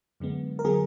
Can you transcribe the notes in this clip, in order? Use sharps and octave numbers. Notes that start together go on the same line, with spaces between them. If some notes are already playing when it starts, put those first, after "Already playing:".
F#2 D3 G#3 B3
A#4
D3 F#3 B3 G#4